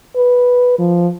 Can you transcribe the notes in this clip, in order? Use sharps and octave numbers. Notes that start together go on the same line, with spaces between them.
B4
F3